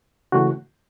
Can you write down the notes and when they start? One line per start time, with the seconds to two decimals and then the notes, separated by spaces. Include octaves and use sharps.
0.32 C#3 E3 A3 F#4